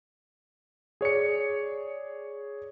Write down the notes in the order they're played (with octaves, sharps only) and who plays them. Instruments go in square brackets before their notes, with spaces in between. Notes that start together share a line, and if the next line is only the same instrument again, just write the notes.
[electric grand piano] G#4 C#5 D5 C#7